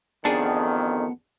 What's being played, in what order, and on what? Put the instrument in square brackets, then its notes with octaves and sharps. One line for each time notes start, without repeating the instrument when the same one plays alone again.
[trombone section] A1 F2 D#3 [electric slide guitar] B3 F#5 A5 [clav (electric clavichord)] D4 G#4